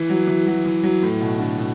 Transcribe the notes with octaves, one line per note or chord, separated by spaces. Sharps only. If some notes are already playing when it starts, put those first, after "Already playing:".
Already playing: E3
F#3
E3
F#3
E3
F#3
A2
B2
D3
B2